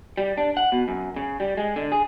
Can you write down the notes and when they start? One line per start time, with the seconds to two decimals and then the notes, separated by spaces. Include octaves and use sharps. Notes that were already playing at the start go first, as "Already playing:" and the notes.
0.18 G3
0.37 D4
0.57 F#5
0.72 B2
0.88 F#2
1.16 C#3
1.40 G3
1.57 G#3
1.76 D3
1.92 G#4